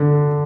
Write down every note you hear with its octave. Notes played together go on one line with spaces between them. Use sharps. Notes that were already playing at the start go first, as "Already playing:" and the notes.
Already playing: D3